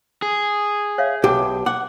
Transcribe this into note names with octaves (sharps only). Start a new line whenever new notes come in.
G#4
C#5 E5 F5
B1 G4
F#5 D6